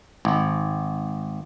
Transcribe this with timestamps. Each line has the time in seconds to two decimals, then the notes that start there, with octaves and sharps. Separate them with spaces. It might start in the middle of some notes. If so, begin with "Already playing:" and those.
0.25 G#1